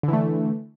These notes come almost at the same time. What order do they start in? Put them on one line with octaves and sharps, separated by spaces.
D3 E3 A3